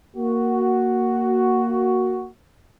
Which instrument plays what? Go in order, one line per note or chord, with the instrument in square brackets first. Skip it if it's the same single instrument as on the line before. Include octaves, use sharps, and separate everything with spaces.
[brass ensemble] A#3 F#4